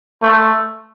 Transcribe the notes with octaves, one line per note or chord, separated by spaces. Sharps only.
A3